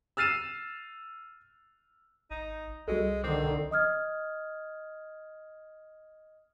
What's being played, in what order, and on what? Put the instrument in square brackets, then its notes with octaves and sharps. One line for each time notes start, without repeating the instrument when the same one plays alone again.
[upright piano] E6 F6 A6 C7 D#7 E7
[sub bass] G#1 [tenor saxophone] D#4
[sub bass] C2 [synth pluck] G3 F#4 A4 [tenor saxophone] G#3
[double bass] D3 D#3 [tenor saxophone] C4 [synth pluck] D6
[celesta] D#5 D#6 F6 G#6